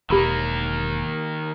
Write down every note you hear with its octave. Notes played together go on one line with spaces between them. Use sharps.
E1 D#3 A#3 D#4 G4 B5 E6